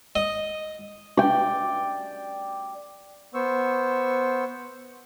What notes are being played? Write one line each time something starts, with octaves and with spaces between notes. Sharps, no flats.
D#5
D5 G5
B3 C5 C#6 E6